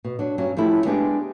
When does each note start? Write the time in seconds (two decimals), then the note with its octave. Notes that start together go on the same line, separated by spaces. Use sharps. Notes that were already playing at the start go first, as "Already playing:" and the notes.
0.04 B2
0.19 F#3 D4
0.38 G2 F#3 C#4
0.57 F3 A3 C#4 E4 G4
0.85 G#3 B3 D4 G4 G#4